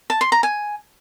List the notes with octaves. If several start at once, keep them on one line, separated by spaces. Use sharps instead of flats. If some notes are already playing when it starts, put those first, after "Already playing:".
A5
C6
A#5
G#5